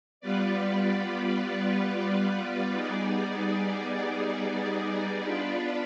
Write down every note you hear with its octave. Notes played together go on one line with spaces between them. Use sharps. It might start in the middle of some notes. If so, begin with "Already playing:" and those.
G3 B3 F4 B4 D5
G3 B3 D#4 G#4 D5
B3 D4 F4 B4 D5